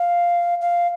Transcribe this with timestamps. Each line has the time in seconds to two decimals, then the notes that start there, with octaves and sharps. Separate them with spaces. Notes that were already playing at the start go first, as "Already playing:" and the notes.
Already playing: F5
0.61 F5